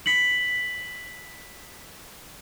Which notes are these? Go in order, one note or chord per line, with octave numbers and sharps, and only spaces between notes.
B6 C#7 F#7